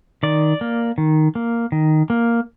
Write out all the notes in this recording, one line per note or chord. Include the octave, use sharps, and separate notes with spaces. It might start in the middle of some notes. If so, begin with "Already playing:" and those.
D#3 D5
A#3
D#3
A#3
D#3
A#3